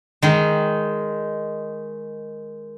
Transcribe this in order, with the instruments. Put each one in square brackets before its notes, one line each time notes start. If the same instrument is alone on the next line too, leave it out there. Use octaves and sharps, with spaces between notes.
[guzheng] D#3 G#3